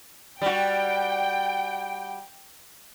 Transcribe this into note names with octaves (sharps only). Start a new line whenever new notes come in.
G3 F#4 G5